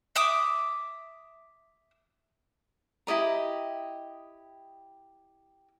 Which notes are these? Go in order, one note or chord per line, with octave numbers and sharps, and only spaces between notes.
E5 D6 D#6
E4 G4 D#5 A#5